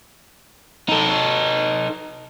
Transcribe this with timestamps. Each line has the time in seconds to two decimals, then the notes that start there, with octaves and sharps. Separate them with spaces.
0.89 D#4 A4